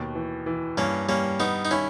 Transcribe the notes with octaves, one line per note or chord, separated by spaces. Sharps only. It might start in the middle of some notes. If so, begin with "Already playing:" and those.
Already playing: D#2 B2
E3
E3
G2 A#3 C#4
G3 A#3 C#4
G3 B3 D#4
D#4
D#3 C#4 E4